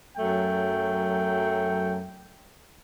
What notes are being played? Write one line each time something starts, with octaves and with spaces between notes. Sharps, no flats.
F#2 F#3 A3 G5